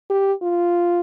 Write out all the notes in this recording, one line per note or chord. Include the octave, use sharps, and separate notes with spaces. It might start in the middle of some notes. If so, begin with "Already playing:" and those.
G4
F4